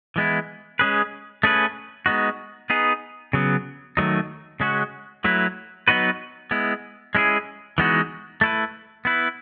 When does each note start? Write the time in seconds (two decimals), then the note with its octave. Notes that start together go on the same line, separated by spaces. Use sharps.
0.16 E3 G#3 B3 E4
0.79 G#3 C#4 G#4 B4
1.43 A3 C#4 G#4 B4
2.06 G#3 B3 D#4 F#4
2.70 B3 D#4 G#4 B4
3.33 C#3 F#3 B3
3.97 D#3 F#3 A3 D#4
4.60 C#3 G#3 C#4 F#4
5.24 F#3 A3 E4 B4
5.88 F#3 B3 D#4 F#4 B4
6.51 G#3 B3 E4
7.15 G#3 C#4 E4 G#4
7.78 E3 G#3 B3 D#4 F#4
8.41 A3 E4 B4
9.05 B3 E4 B4